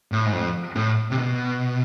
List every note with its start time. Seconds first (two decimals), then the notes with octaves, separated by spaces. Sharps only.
0.12 A2
0.26 G#2
0.33 F2
0.76 A2
1.11 C3
1.18 B2